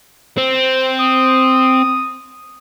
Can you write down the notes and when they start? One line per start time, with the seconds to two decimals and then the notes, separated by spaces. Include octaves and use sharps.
0.38 C4
0.99 D#6